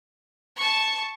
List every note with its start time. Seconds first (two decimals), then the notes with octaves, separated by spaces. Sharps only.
0.56 A5 C#6